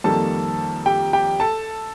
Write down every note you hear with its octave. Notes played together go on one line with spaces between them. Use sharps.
F2 D#3 G3 A#3 A4 A5
G4 G5
G4 G5
A4 A5